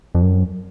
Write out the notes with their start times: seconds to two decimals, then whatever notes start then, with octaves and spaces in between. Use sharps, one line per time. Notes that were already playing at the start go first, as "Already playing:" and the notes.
0.15 F2
0.22 F#2